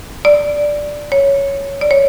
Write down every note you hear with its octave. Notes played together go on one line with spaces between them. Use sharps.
D5
C#5
D5
C#5